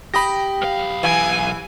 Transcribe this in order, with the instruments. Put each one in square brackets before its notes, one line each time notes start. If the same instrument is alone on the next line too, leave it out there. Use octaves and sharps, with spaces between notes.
[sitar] G4 [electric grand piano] B5 D#6 A#6
[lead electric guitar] B1 F5
[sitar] E3 [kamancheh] G#5